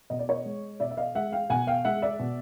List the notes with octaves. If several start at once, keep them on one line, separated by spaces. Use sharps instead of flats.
B2 D#5
D5
C#5 D#5
G#3
B2 D5 E5
E5
D#5 F5
G#3 E5 F#5
F5 G5
B2 F#5 G#5
F5 G5
G#3 E5 F#5
D5 E5
B2